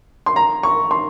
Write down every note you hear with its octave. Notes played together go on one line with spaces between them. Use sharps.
C6
A#5
C#6
C6